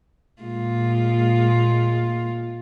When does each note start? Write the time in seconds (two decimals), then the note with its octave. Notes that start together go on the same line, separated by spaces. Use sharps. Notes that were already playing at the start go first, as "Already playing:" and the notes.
0.42 A#2 G#3 F4